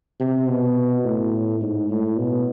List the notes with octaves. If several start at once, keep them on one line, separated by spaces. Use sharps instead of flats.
C3
B2
A2
G#2
A2
B2